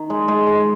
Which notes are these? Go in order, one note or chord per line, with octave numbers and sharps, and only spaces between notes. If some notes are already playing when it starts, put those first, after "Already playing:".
Already playing: D#3
G#3
G#3
G#3